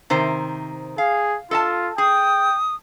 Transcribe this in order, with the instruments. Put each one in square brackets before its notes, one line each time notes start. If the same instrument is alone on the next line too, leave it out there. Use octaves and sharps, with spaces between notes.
[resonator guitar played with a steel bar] C3 D#3 C5
[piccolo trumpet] G#4 [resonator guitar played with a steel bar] F5
[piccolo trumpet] F4 [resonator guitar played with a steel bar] A4 D#5 A5
[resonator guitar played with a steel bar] G#4 [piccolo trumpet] G5 [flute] D#6